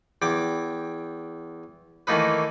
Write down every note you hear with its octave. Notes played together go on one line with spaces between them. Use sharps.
E2 G5 D6
D#3 E3 A3 A#3 D#4 B4